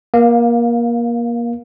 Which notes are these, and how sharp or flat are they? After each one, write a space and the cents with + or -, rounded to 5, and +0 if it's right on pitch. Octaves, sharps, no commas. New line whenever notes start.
A#3 +25 F5 +0